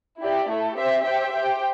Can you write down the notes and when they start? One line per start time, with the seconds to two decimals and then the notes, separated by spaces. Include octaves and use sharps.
0.21 E4 G4 D5
0.49 A3 E4 A4
0.77 C4 G4 C5 E5
1.05 G4 C5 E5 G5
1.32 G4 C5 G5